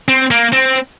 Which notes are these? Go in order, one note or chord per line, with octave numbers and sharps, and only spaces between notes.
C4
A#3
C4